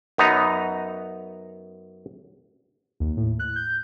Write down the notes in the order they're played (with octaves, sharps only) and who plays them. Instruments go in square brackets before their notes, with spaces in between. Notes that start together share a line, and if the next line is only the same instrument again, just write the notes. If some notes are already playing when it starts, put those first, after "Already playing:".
[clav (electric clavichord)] F#2 B3 D#4 A#5
[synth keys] D#2
A2
F#6
G6